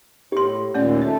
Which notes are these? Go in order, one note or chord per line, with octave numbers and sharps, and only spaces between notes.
A2 G4 C6
D#2 A#2 A3 C#4 D5
A3 C#5